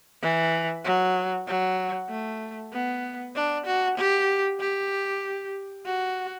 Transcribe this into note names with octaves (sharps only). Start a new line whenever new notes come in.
E3
F#3
F#3
A3
B3
D4
F#4
G4
G4
F#4